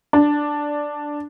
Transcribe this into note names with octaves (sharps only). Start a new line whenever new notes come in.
D4